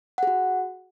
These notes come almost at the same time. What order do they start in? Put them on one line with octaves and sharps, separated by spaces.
F#5 G#4 F#4